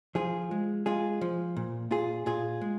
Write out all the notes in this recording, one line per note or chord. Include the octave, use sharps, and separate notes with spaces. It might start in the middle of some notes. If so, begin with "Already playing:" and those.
F3 F4 G#4
G#3
G#3 F4 G#4
F3
A#2
A#2 F4 G#4
A#2 F4 G#4
G#3